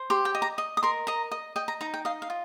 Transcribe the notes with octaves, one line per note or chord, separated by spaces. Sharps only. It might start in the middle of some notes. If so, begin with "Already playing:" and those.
Already playing: C5
G4 C6
G5
D#5
A#5
D#5
D#6
A#4 C6
D#5 A#5
D#5
D#5 G5
A#5
D#4 A#5
G5
D#5 F5
F5
F4